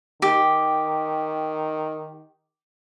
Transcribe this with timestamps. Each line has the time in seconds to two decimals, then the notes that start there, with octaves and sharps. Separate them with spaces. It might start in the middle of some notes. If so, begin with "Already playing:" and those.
0.22 D#3 G4